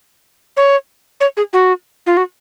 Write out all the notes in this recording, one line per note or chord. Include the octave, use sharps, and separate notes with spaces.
C#5
C#5
G#4
F#4
F4
F#4